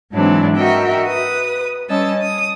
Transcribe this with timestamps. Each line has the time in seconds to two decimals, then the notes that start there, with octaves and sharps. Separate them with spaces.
0.12 G#2 E3 F#3 C4 D4
0.56 F#4 A#4 D#5 E5 G5
1.05 B4 D#6
1.89 G3 C#4 D#5 A5 E6
2.21 D#6